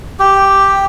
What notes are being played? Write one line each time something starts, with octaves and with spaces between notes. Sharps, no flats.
G4